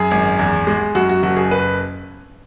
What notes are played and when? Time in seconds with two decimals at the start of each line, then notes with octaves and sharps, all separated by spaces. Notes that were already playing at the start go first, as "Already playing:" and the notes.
Already playing: F#2 G#4
0.11 G#1
0.39 E2
0.67 G#3
0.95 F#2 F#4
1.09 F#4
1.23 F#1 F#4
1.37 G#4
1.51 B4